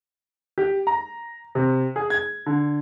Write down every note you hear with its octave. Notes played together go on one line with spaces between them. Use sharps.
G4
A#5
C3
G#4
G#6
D3